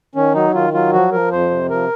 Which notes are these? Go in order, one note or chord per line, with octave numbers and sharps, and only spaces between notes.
D#3 C#4
F#3 D#4
D#3 F4
F#3 F4
F3 F#4
F3 A#4
F2 C5
C3
F3 A#4